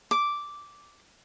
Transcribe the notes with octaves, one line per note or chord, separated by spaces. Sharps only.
D6